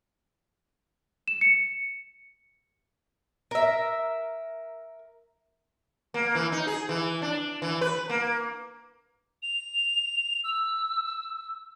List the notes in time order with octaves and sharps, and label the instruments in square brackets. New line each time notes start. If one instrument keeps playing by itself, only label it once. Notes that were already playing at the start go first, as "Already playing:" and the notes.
[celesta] E7
C#7
[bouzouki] A#4 E5
[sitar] A#3
E3
D#4
G#4
E3
D4
E3
B4
A#3
[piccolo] F7
E6